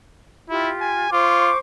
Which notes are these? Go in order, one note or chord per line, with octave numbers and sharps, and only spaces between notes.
E4 F4 G4
G#5
F4 C5 C#6 D6